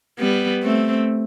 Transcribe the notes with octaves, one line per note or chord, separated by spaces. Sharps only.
G3 B3
A3 C4